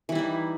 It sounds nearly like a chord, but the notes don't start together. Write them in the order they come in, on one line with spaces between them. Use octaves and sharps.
E3 G3 E4 D#4